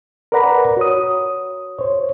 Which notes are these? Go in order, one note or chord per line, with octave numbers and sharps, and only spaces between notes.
A#4 B4 D5 F#5 A#5 B5
F#4 C#5 D#6
C5 C#5